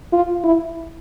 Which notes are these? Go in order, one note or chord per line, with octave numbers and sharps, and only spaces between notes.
F4
E4